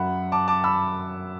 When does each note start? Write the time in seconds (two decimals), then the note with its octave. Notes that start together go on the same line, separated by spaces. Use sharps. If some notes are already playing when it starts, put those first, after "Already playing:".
Already playing: F#2 F#3 E5 F#5 B5
0.32 A5 D6
0.48 A5 D6
0.64 B5 E6